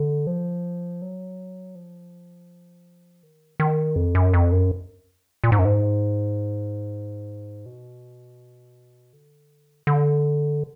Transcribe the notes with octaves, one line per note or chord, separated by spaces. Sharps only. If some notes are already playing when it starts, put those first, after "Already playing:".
Already playing: D3
F3
F#3
F3
D#3
D#3
F2
F#2
F2
F#2
A#2
G#2
F#2
G#2
B2
D3
D3